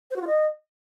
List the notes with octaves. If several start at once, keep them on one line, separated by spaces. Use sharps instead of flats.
C5
F#4
F4
D#5